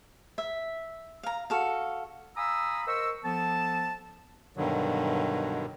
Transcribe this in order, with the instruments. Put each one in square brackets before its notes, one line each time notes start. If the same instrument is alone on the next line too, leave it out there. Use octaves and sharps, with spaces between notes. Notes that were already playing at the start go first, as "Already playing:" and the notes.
[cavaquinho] E5
F5 A#5
F#4 A4 F5
[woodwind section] F5 G#5 A#5 B5 D#6 E6
A#4 C5 D#5 C#6 E6
F3 B3 A4 A5
[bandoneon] G2 B2 D3 D#3 F#3